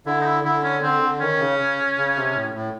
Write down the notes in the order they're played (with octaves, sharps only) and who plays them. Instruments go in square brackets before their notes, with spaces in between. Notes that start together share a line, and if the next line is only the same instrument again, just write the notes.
[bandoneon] D3 [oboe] E4
[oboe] D#4
E4
[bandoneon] D3 [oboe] E4
[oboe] C#4
[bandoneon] D3 [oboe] C4
[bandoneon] D3
[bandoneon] D#3 [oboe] C#4
[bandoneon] C#3
C#3
C#3
C3
A2
A2